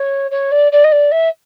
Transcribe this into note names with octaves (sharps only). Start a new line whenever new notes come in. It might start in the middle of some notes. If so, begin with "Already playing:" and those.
Already playing: C#5
C#5
D5
D5
D#5
D5
E5